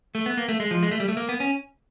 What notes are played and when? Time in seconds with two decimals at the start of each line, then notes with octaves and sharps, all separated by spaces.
0.15 A3
0.26 B3
0.37 A#3
0.49 A3
0.60 G#3
0.71 F3
0.83 G#3
0.91 A3
1.00 G3
1.08 A3
1.17 A#3
1.29 B3
1.40 C#4